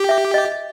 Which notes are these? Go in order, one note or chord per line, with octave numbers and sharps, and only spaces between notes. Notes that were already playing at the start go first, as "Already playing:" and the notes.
Already playing: G4
E5
D#5